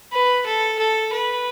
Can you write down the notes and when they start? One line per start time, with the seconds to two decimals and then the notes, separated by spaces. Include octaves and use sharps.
0.12 B4
0.46 A4
0.79 A4
1.13 B4